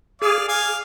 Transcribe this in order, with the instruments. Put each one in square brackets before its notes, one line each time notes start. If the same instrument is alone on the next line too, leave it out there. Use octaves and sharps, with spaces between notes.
[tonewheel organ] G#4 [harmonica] D5 F5
[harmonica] F5 G#5